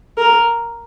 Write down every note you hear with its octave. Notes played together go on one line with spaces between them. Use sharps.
A#4